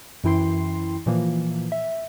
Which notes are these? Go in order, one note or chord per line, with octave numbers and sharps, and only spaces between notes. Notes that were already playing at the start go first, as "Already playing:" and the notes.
F#2 E3 E4 G5 C6 C7
A#2 E3 F3 A#3
E5